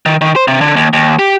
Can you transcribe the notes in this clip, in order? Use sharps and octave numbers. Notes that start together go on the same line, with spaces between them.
D#3
D#3
C5
C3
D3
D#2
D#2
G4